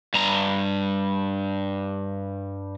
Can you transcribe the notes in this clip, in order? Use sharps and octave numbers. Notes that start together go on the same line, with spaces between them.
G2 A#5